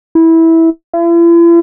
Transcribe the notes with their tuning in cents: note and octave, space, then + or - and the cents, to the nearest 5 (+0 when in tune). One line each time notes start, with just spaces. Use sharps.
E4 -15
E4 +45